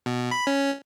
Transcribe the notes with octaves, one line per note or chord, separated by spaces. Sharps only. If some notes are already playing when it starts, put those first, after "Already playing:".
B2
B5
C#4